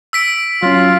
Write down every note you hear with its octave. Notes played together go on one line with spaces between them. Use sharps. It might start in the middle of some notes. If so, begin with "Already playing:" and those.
E6 B6 D7
F#3 C#4 F4